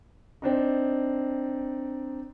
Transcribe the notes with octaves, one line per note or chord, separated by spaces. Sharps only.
C4 D4 D#4